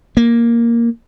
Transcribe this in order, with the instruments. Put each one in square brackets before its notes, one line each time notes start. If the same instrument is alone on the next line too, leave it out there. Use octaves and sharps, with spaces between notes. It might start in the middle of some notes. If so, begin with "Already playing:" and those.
[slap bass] A#3